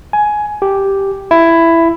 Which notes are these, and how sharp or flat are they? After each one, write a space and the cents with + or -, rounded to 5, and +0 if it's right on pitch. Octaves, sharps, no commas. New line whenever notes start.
G#5 +15
G4 +0
E4 +10